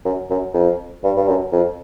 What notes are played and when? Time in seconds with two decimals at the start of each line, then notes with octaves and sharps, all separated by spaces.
0.05 F#2
0.30 F#2
0.54 F2
1.04 G2
1.17 G2
1.28 F#2
1.52 F2